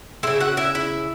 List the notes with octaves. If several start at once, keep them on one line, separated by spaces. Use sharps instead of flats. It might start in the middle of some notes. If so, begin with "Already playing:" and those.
C#3 G#3 E4 E5
F#4 F#5
E4 E5
E4 E5